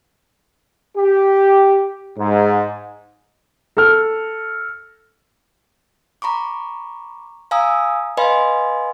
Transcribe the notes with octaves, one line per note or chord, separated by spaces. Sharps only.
G4
G#2
A4 F6
A#5 B5 C#6 D6
F5 G#5 A#5 D#6 E6
B4 D#5 F5 G#5 B5 C6